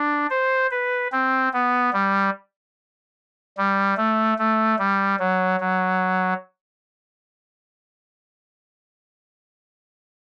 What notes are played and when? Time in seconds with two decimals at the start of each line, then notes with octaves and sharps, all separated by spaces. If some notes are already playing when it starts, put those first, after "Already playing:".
Already playing: D4
0.30 C5
0.71 B4
1.12 C4
1.53 B3
1.93 G3
3.57 G3
3.97 A3
4.39 A3
4.79 G3
5.19 F#3
5.60 F#3